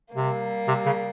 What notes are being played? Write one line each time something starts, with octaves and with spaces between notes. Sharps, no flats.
C3 G3 A#3
C3
C#3